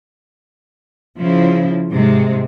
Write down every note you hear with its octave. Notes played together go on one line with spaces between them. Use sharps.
C#3 F3 E4
G#2 C3 G#3